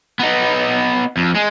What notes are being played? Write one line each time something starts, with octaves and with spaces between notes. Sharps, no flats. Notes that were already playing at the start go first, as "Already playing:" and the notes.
B3 D#4
F2
G#3